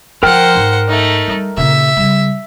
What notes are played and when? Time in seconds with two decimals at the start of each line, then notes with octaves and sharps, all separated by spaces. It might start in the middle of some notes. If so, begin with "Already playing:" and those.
0.23 F3 A#4 C5 F#5 G5 F6
0.55 G#2
0.89 A3 D#4
1.27 G3
1.57 A#2 C#3 E5
1.97 C#3 G3